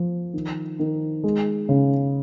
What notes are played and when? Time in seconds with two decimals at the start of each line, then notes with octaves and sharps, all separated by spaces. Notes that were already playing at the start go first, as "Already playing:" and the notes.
Already playing: F3
0.34 D#3
0.79 D#3
1.24 G#3
1.69 C#3